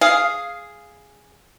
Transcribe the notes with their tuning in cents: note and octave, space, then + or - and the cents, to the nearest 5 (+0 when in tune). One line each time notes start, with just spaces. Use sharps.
G#4 +0 F5 +0